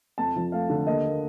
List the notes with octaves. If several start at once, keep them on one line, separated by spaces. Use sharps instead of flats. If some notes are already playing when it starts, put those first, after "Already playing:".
F2 A5
F3
A3 F5
D3
D#2 D#5
A#3